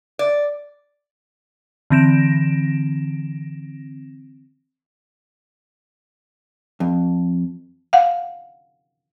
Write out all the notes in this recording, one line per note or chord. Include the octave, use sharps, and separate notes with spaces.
D5
D3 E3 C4 A#6 D7 E7
F2
F5 F#5